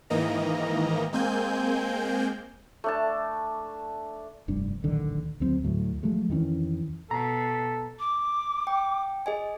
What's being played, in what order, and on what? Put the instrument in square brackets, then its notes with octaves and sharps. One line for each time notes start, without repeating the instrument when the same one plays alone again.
[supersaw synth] G#2 D#3 E3 A#3 D#5 A#5
G#3 A#3 C4 G#5 G6
[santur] A3 D4 A5
[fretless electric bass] F1 G2 D4
D1 A#1 D3 D#3
D2 F#3 C4
D2 A2 F#3 A3
F3 F#3 G#3 A3
F2 D#3 E3 C#4
[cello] B2 [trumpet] A4 [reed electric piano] A#5
[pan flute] D6
[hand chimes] G5
G#4 D#5 G#5